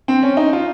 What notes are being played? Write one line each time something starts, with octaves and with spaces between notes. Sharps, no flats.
C4
C#4
D#4
F4